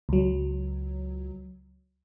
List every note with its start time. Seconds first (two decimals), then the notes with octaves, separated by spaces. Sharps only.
0.09 C#2 F#3